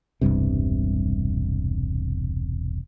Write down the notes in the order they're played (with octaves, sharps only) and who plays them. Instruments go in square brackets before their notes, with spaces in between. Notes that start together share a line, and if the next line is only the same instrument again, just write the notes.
[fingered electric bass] E1 C2 G2 C3